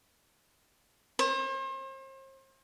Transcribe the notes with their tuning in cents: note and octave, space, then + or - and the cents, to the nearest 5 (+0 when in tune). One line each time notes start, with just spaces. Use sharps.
C5 +40